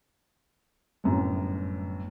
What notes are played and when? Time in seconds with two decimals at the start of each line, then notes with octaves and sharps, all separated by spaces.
1.04 G1 F#2 A2